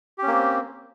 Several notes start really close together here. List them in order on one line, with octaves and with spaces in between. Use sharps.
G4 C#4 A#3 C4